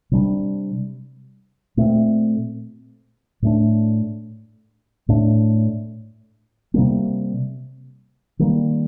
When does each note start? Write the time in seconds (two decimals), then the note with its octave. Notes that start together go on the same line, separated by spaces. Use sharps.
0.11 C3 G3 D4
1.77 A#2 A3 C4
3.42 A2 A3 D4
5.09 A2 A3 D4
6.74 C3 G3 A#3
8.39 D#3 G3 A#3